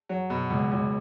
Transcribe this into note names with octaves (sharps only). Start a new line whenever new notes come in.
F#3
B2
C#2
C#2